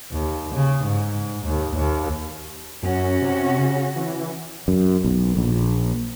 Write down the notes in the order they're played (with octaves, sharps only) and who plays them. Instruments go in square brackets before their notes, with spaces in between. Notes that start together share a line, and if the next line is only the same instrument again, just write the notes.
[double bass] D#2
C#3
G#2
D#2
D#2
[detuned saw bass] F#2 [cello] C#4 F#4
[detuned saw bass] C3
C#3
E3
[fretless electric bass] F#2
B1
A#1